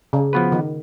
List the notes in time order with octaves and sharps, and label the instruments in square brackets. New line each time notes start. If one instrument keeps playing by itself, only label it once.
[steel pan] C#3
[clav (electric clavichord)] F3 B3 F#4 B4
[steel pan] D#3